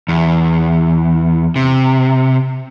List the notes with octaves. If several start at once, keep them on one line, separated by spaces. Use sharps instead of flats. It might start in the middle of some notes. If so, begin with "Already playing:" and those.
E2
C3